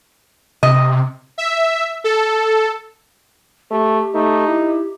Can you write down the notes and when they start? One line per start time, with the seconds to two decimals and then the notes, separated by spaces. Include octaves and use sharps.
0.63 C3 D#5
1.38 E5
2.04 A4
3.71 A3 G4
4.15 A3 D#4
4.47 E4